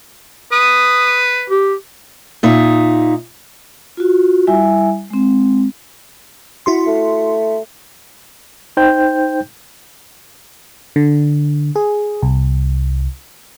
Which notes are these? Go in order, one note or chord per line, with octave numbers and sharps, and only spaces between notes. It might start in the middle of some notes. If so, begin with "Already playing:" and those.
B4 D#6
G4
A#2 D#4 E5
F4 F#4
G3 E4 E5 G#5
G#3 C4
E4 F#4 C6
A3
D#4 C5 G5 G6
D3
G#4
C2